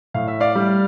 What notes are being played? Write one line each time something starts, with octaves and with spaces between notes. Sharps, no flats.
A2 F5
E5
D5 F5
G3